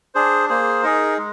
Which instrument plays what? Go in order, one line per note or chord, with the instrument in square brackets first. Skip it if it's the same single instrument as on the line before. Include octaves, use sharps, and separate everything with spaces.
[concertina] D4 G#4 C5
A#3 G#4 C5
D#4 G#4 A#4
G#3